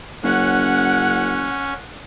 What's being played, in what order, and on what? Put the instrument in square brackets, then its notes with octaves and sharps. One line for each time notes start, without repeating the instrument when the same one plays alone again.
[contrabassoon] F#1 [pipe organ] C#4 [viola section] F#5